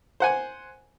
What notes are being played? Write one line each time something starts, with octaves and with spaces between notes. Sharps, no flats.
C5 F#5 G#5